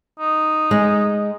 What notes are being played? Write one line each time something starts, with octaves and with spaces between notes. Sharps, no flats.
D#4
G#3